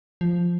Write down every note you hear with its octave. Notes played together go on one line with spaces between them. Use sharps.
F3